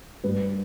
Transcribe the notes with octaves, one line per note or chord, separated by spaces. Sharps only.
G2 B4